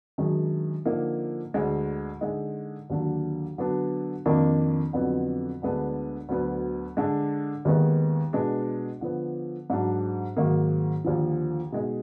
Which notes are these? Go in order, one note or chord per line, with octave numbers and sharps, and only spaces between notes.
F#2 D#3 G#3 D4
D3 F3 A#3 D#4
D2 D3 G#3
D3 G#3 D#4
D#2 D3 F#3 D4
D3 F#3 B3 D4
F2 D#3 A#3 D4
F2 D3 F#3 B3
D2 D3 G#3 B3 D4
D2 D3 F#3 B3
D3 G#3 D4
D#2 D#3 G#3 B3 D#4
B2 G#3 B3 D4
D3 F3 B3
G#2 F#3 D4
G#2 D#3 F#3 A#3
D#2 D3 F3
B2 G#3 D#4